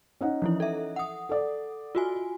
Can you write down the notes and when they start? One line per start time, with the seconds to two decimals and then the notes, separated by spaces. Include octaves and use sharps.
0.21 C#4 D#4 F#5
0.42 E3 F3 E4
0.60 A4 E5
0.96 F#5 D#6
1.29 A4 D5
1.95 F4 F#4 G#5